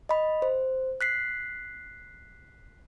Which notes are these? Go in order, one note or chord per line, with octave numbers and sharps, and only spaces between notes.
D#5 B5
C5
F#6 B6 C7